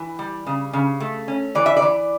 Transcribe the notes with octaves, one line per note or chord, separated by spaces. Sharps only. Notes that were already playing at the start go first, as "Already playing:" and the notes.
Already playing: E3
G3
C#3
C#3
A3
C#4
E3 D5
E5
D5
E3